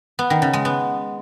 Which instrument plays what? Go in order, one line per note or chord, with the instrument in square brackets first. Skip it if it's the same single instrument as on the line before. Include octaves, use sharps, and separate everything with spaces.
[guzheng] B3
D#3
C#3
G#3
B3